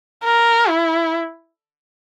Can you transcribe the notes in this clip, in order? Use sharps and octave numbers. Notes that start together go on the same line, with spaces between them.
A#4
E4